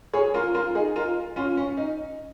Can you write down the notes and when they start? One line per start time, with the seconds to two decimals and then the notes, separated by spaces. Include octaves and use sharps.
0.13 G#4 C#5
0.34 F4 A#4
0.54 F4 A#4
0.75 D#4 G#4
0.96 F4 A#4
1.36 C#4 F4
1.57 C#4
1.77 D#4